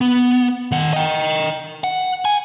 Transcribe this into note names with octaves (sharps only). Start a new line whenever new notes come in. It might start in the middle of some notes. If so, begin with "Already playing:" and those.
B3
D#3 F#5
D#5 G5
F#5
G#5